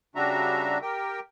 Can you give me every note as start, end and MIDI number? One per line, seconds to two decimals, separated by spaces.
0.15 0.78 49
0.15 0.78 55
0.15 0.78 62
0.15 0.78 66
0.15 0.78 76
0.15 0.78 82
0.82 1.20 67
0.82 1.20 70
0.82 1.20 79